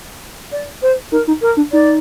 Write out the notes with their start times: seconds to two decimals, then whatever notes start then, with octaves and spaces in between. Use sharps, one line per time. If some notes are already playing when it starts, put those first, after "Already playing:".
0.52 D5
0.82 C5
1.12 D#4 A#4
1.27 D#4
1.41 A#4
1.57 D4
1.72 D#4 D5